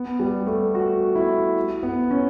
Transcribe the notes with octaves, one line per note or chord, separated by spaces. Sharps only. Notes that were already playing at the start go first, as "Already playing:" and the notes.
Already playing: B3
G3
A3
F#4
E4
B3
C#4